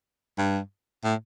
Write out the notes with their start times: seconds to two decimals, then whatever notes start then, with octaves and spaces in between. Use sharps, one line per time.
0.39 G2
1.04 A2